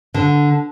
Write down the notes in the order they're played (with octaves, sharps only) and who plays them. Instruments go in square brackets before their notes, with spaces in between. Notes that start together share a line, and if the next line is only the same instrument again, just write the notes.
[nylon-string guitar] D3